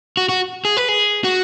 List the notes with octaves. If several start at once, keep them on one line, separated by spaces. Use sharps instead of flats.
F#4
F#4
G#4
B4
G#4
F#4